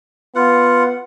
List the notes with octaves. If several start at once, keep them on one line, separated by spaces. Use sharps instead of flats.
B3 F4 F#5